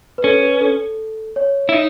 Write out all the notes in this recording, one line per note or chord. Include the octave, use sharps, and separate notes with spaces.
B4
C#4 A4
B4
A4
C#5
E4
D#4